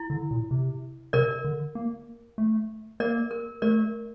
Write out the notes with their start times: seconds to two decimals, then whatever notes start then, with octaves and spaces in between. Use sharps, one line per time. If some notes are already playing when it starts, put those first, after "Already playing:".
Already playing: E4
0.10 D3
0.31 A#2
0.51 C3
1.13 C3 A#4 D5
1.45 D3
1.75 A#3
2.38 A3
3.00 A#3 A#4 D5
3.31 A#4
3.62 A3 A#4 D5